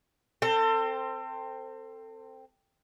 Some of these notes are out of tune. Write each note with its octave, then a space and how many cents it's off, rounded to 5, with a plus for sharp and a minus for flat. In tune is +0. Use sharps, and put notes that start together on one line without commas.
C4 +0 A4 +30